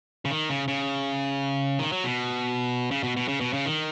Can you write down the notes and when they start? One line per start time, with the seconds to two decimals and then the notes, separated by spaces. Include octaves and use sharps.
0.25 C#3
0.31 D#3
0.49 C#3
0.68 C#3
1.79 D#3
1.92 F#3
2.04 B2
2.91 C#3
3.03 B2
3.17 B2
3.28 C#3
3.41 B2
3.53 C#3
3.66 D#3